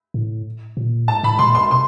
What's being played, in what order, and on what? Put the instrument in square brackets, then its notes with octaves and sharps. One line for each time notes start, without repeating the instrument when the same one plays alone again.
[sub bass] A2
A#2
[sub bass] A2 [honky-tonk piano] A5
[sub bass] A2 [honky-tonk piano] B5
[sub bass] A#2 [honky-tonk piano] C6
[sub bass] B2 [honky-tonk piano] C6
[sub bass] C3 [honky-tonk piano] C6